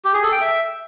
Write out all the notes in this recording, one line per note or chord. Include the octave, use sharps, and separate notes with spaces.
G4
G#4
A4
G5
E5